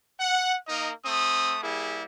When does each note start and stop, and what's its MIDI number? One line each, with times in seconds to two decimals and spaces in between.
0.20 0.54 78
0.68 0.91 58
0.68 0.91 63
0.68 0.91 70
0.68 0.91 75
1.05 1.59 57
1.05 1.59 60
1.05 1.59 87
1.63 2.03 55
1.63 2.03 58
1.63 2.03 64
1.63 2.03 68